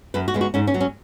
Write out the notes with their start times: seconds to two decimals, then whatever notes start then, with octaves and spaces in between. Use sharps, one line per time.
0.14 F#2 B4
0.28 F#4
0.34 C#3 G#3 B3
0.41 F#4
0.54 G#2 C#4
0.67 C#4
0.74 F#3 B3
0.81 C#4